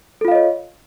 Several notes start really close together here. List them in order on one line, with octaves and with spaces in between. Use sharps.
A4 F4 F5 D#5 C#5